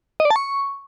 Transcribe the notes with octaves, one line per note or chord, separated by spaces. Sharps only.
D#5
D5
A5
C#6